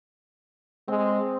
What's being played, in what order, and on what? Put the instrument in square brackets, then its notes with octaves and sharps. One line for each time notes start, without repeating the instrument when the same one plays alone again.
[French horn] G#3 [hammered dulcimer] C4